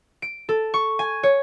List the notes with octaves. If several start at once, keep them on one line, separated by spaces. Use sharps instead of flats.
D7
A4
C#6
G#5
C#5